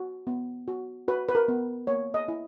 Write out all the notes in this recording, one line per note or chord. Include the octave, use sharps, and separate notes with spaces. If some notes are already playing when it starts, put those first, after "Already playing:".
Already playing: F#4
B3
F#4
F#4 B4
B4
A#4
B3
A#3 C#5
D#5
E4